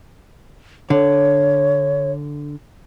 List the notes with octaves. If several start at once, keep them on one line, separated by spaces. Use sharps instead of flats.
D3 C#5